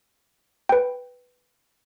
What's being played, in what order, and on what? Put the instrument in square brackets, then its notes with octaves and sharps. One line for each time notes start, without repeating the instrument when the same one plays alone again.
[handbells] B4 G5